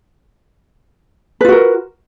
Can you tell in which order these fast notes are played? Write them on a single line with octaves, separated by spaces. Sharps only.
B4 F4 F#4 A#4